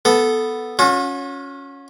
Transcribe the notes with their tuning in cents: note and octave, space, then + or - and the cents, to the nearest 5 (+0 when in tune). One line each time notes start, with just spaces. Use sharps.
B3 +0 A4 -5
C#4 +0 F#4 -40